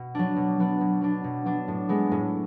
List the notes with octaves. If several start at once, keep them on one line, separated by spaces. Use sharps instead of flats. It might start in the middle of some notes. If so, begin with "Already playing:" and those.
Already playing: B2
F#3 B3 D4
B2
F#3 B3 D4
B2
F#3 B3 D4
B2
F#3 B3 D4
A2
G#3 B3
A2